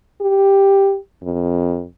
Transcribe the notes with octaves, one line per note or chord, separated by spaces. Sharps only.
G4
F2